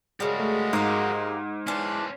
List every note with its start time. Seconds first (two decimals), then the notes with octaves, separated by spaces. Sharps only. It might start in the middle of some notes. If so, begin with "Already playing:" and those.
0.20 C#3 G3 G#3 F#4 A#4
0.40 A3
0.73 G#2 A#3 G4
1.67 E3 C#4 D4 C5